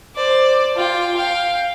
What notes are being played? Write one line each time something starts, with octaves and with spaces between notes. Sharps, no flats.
C5 D5
F4 G5
F5 G5